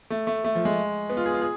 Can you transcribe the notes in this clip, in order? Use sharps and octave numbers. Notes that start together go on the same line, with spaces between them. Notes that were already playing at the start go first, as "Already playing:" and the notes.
A3
A3
A3
F3
G#3
B3
F4
G#4
F4
G#4